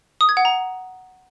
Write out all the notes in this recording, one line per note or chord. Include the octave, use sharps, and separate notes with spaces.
D#6
G#6
F#5
A#5